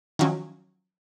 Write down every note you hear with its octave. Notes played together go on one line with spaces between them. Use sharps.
D#3 F3 F#3 C#4